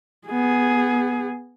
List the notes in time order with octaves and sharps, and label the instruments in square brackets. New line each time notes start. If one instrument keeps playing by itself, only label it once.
[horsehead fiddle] B3 G#4